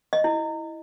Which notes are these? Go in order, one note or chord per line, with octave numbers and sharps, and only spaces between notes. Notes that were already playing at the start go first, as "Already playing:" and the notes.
D#5
E4